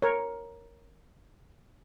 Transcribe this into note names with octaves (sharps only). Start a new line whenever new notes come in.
A#4 C#5